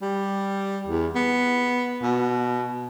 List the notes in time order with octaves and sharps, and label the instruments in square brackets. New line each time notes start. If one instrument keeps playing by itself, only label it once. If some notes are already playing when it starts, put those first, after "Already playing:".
[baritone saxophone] G3
E2
B3
B2